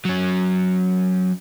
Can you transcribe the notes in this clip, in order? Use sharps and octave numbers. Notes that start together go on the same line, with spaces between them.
F#3 C#4